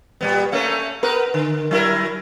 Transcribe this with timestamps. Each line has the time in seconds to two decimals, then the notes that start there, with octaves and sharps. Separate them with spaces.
0.21 A#2 G3 B3
0.52 A3 A#3 C#4
1.03 B3 A#4 B4
1.34 D3
1.71 F#3 E4 A#4